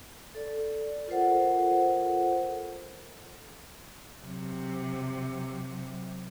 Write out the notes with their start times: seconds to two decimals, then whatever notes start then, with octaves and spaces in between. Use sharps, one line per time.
0.35 A4 D5
1.08 F4 A4 A#4 C5 F#5
4.23 C3 F#3